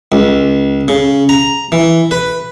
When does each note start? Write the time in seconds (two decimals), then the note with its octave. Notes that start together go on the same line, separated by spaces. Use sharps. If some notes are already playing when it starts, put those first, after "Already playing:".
0.12 C#2
0.88 C#3
1.29 A#5
1.72 E3
2.11 B4